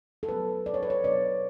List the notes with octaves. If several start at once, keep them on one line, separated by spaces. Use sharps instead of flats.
A4
B2 F#3 B3 B4
D5
C#5
B4
C#5
B2 F#3 B3 D5